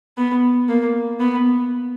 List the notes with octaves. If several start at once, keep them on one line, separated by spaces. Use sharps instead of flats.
B3
A#3
B3